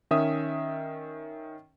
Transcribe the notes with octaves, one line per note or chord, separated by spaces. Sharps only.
D#3 C#4 E5 D#6